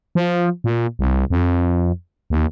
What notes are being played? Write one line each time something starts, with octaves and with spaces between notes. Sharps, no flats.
F3
A#2
C2
F2
D#2